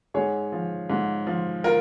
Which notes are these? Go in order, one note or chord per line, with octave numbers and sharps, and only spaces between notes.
G#2 G#4 C#5
F3
G#2
F3
F4 A#4